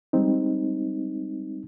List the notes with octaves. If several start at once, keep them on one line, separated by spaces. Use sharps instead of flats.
G3 G#3 C4 D#4